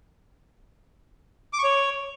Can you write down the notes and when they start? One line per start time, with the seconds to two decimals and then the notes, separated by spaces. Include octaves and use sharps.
1.53 D6
1.58 C#6
1.64 C#5